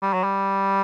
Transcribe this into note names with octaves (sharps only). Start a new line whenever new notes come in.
G3
F#3
G3